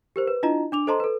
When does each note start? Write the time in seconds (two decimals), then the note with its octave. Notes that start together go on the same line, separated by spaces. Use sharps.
0.16 G4 A#4 C5
0.27 B4
0.43 D4 E4 F4 D#5 A5 A#5
0.72 D4 D6 F7
0.87 A4 C5 D#5 A5 A#5 C6
1.00 A4 B4